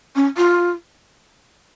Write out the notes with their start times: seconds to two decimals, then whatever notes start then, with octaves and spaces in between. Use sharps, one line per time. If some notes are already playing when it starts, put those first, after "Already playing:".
0.16 C#4
0.37 F4